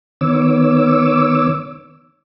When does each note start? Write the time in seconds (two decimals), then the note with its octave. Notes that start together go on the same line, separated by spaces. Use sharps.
0.21 D#3 B3 C#5 D6 E6